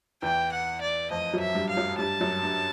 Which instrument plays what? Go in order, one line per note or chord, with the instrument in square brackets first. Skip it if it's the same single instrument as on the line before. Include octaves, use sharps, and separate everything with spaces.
[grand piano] E2 E3 [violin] G5
[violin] F#5
D5
[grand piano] F2 F3 [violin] D#5
[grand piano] F#2 F#3
[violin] E5
[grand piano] G2 G3
[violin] F5
[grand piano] F#2 F#3
[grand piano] G2 G3 [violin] A5
[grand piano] F#2 F#3
G2 G3